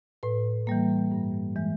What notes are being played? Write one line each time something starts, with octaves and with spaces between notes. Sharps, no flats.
A2 B4
E3 G3 A#3
G2
E3 G#3